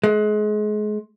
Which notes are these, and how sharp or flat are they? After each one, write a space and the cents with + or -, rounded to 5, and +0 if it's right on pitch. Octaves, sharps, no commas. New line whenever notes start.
G#3 +30